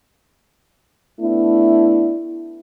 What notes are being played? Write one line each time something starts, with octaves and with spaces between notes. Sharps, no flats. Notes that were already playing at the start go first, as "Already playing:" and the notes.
A3 B3 D4 E4